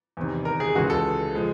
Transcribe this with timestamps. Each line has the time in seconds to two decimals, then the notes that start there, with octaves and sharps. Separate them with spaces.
0.17 E2 C3 D#3
0.45 A#4
0.60 G#4
0.75 C#2 C#3 E3 G#3 F#4
0.90 A4
1.35 F3 G#3